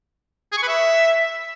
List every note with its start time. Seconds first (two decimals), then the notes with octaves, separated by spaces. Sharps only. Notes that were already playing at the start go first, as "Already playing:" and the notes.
0.52 G#4
0.58 C#6
0.63 B4
0.68 E5